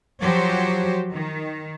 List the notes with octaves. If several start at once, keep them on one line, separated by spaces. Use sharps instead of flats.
F3 F#3 F#4 G4 C5 C#5
D#3